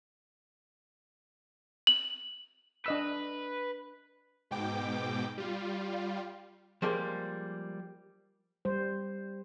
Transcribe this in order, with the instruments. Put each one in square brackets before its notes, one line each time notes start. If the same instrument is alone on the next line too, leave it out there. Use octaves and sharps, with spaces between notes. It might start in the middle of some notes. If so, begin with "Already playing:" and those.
[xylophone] F#7
[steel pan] D4 D#5 E6 [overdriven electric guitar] B4
[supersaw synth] G#2 B2 G5 D6
G3 F4
[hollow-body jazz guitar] F3 G3 G#3 A#3
[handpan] G3 C5